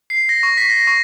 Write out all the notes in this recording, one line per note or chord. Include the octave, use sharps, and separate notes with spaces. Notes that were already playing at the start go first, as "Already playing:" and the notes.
C7
A#6
C#6
B6
A#6
C#6